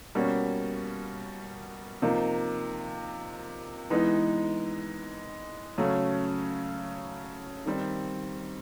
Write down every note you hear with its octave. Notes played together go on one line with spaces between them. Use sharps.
B2 G3 A#3 C#4 F#4
C3 F3 A#3 D#4
E3 G#3 B3 D#4
C#3 F#3 A3 C#4
D#3 G3 C4